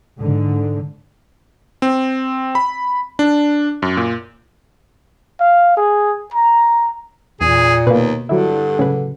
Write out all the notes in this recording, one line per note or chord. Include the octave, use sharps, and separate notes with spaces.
G#2 D3
C4
B5
D4
F#2
A#2
F5
G#4
A#5
E2 A#2 G#4 G#5
D#2 B2 A#3 B4
G2 D3 F#3 D4 E4
A2 C#3 F#3 C#4 B4